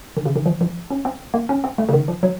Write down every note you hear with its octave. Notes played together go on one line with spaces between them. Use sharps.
D#3
C#3
D#3
F3
F3
C#4
C4
A#3
C#4
C4
A3
C#3
D#3
F3
F#3